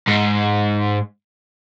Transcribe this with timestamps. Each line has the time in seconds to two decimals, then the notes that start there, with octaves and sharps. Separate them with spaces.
0.08 G#2